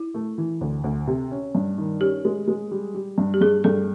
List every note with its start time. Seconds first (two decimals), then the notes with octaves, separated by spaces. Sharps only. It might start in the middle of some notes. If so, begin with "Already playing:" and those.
Already playing: E4
0.14 A3
0.38 E3
0.61 D2
0.84 D2
1.07 C3
1.31 C#4
1.55 G2
1.78 D#3
2.01 C#4 G4
2.25 G#3
2.48 G#3
2.71 G3
2.94 G3
3.18 G2
3.34 G4
3.41 G2 G#4
3.64 G2 A4